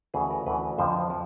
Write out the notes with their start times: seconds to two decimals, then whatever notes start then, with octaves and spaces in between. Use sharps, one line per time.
0.14 D2 C#3 E3 G#4
0.30 A#4
0.46 D2 C#3 E3 B4
0.78 F2 D3 F3 C5
1.10 F3